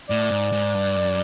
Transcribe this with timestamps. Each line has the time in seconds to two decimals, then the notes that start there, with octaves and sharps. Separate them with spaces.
0.09 A2 D5
0.31 G#2
0.52 G#2
0.75 G2
0.96 F#2